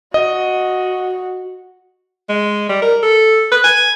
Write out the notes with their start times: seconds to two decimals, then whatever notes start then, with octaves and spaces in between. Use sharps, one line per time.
0.14 F#4 D#5
2.29 G#3
2.69 G3
2.82 A#4
3.03 A4
3.52 B4
3.64 G#5